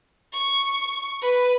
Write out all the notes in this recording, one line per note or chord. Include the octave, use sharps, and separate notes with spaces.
C#6
B4